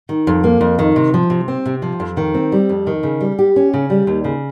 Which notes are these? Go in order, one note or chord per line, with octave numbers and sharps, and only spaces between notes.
D#3
F2
A#3
F2
D#3
C3
F3
C3
C4
C3
F3
F2
D#3
C4
G3
F2
D#3
C#3
G3
G4
C#4
C#3
G3
D#2
C#3